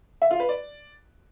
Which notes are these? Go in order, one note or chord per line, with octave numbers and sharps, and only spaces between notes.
E5
F4
B4
D5